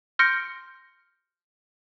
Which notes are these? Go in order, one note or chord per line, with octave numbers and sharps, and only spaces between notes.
C6 F6 G6 A#6 C#7 D7